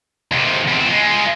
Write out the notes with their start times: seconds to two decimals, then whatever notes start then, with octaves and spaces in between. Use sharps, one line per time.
0.32 D#2 C3
0.68 E2 C4
0.88 G#3 F4